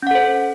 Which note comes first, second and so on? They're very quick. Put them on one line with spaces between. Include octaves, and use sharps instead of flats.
C#4 F#5 A4 C5